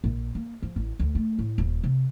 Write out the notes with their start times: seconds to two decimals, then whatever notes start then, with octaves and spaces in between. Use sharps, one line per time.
0.04 A#1
0.35 A#3
0.62 F3
0.76 A1
1.00 D2
1.15 A3
1.39 A2
1.58 D#1
1.84 C3